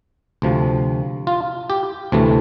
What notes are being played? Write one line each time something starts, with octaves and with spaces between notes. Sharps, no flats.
D2 C3 F3
F4
G4
D2 C3 E3 A3